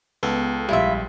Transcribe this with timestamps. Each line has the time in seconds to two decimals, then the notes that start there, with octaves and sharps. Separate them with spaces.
0.23 C#2 B3 A4
0.69 A#1 G3 E4 F4 E5